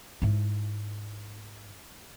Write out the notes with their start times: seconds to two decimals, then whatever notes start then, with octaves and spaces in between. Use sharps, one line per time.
0.22 G#2 E4